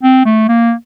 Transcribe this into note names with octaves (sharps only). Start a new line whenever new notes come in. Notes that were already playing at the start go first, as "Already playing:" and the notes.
C4
A3
A#3